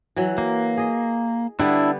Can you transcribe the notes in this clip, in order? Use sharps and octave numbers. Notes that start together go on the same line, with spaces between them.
E3 F#3
A#3
G#4 D#5
D3 G3 B3 D4 E4